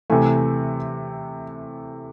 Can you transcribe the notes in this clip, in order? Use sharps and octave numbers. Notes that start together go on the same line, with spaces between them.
C3 E3 A3 G#5